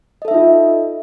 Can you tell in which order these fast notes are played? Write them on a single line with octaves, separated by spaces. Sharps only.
D#5 A4 E5 D#4 F4